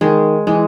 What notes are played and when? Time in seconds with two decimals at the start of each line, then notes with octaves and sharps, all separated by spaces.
0.01 D#3 G#3
0.47 E3 G#3